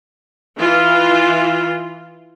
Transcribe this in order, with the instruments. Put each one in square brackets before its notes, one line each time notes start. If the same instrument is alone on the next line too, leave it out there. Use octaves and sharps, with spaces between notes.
[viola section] E3 F4